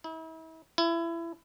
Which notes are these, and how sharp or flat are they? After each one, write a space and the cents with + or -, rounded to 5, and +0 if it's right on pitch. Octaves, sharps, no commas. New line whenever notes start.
E4 -40
E4 +25